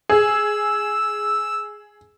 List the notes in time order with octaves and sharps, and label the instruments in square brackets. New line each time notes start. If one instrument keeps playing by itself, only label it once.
[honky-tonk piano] G#4 [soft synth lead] E6